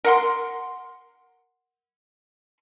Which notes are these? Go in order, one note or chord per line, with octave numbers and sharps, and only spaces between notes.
A#4 F#5 C6